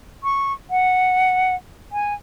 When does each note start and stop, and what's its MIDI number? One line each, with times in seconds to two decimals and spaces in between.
0.24 0.53 85
0.70 1.55 78
1.92 2.14 80